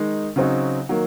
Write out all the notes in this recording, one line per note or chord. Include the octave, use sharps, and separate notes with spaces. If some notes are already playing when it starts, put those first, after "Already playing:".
Already playing: D#3 G#3 D#4
C#3 F#3 C4 D#4 F#4
D#3 F#3 A#3